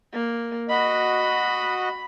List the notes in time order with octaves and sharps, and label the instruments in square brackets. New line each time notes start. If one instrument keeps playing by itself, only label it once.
[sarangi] A#3
[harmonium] F#4 D#5 [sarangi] B5